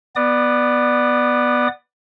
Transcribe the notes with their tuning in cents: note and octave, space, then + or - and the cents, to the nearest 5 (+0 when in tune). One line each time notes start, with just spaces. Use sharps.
B3 +0 D5 +15 D#6 -25